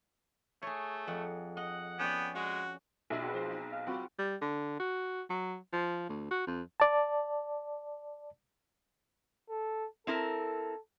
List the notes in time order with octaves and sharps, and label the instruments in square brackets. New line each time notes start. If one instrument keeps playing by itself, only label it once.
[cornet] A3 [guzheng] G#4 C#5
[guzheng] F2 F#5
[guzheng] D#5 [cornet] F#5
[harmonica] B3 G5 [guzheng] C#4 D5
[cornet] G#3 [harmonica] F#4
[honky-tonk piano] B1 [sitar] D4 E4 G#4 [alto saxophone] E5
[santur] C4 B4 [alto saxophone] F#4
[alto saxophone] F3 [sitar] F4 C5
[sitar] D#4
[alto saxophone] F5
[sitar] C#3 F#3 [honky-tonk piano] C4 [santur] F4 F#4
[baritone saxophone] G3
D3
F#4
F#3
F3
D2
F#4
F2
[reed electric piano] D5 A5
[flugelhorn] A4
[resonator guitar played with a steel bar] C4 E4 A#4 [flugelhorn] A4